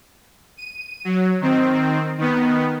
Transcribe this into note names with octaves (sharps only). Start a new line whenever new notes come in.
D#7
F#3
D#3 C4
D#3 B3